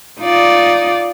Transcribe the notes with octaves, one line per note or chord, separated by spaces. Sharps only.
D#4 F4 D5